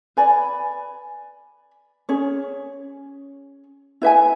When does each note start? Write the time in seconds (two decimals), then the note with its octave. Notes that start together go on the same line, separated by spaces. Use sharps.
0.17 B4 D5 G#5 B5
2.09 C#4 G#4 C#5
4.02 E4 B4 E5 G#5